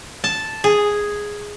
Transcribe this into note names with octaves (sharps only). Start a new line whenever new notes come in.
A5
G#4